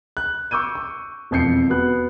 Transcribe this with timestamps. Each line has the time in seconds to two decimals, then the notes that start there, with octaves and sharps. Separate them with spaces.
0.17 F#6
0.51 C#6 D6 E6 G6 D#7
0.75 C#6
1.31 E1 F2 G6 C7 C#7
1.70 B3 F#4 F#6